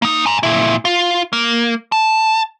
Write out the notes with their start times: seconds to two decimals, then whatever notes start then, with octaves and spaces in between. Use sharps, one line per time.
0.02 A#3 D#4
0.26 G#5 A#5
0.43 A#2 E4
0.85 F4
1.33 A#3
1.92 A5